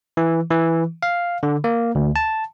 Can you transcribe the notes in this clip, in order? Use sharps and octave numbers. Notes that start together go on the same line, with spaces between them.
E3
E3
F5
D3
A#3
D2
A5